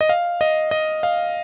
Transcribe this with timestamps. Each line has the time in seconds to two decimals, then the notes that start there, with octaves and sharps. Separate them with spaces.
0.01 D#5
0.09 F5
0.41 D#5
0.71 D#5
1.03 F5